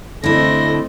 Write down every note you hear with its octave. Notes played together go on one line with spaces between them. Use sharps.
D3 A3 C4 E4 D#5 C6 A#6